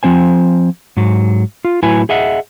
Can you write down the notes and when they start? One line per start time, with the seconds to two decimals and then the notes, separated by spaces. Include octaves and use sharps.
0.03 F3 C4 C5 G#5
0.97 G#2 F#3
1.65 F4
1.83 A2 F#3 E4 B4 G#5
2.09 G#4 D#5 E5 F#5